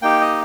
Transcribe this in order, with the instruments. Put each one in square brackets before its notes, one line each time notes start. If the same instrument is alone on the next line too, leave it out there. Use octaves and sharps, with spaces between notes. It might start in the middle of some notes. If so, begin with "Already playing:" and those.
[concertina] A#3 D#4 G4 G5
D#5